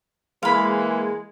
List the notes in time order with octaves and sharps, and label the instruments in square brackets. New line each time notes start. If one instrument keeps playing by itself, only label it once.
[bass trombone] E3 [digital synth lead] G#3 [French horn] A#3 [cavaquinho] F5 B5